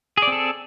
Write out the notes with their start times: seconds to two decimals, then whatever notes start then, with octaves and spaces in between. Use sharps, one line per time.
0.17 G#4
0.22 D5
0.27 C4
0.32 A4